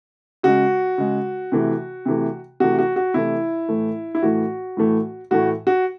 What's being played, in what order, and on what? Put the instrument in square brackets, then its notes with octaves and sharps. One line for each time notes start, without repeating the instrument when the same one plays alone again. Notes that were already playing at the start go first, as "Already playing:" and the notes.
[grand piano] C#3 G#3 F#4
C#3 G#3
C3 E3 A3
C3 E3 A3
C3 E3 A3 F#4
F#4
F#4
C3 E3 A3 E4
A2 E3 A3
E4
A2 E3 A3 F#4
A2 E3 A3
A2 E3 A3 F#4
F#4